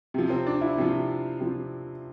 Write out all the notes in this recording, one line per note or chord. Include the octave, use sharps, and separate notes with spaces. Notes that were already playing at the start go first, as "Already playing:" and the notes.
C3 F3
C4
D4
E4
C3 F3
C3 F3